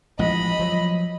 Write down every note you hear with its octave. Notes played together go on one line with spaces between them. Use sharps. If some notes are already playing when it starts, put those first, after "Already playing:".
A1 F3 G#3 D#5 B5
F3 F#3